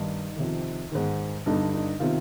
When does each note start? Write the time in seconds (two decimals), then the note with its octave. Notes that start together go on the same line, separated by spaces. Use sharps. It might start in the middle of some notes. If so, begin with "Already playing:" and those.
Already playing: G2 D#3 D#4
0.36 F2 C3 D#3
0.92 G#2 D#3
1.46 G2 D3 D#4
1.73 D#4
1.99 C3 D#3 F4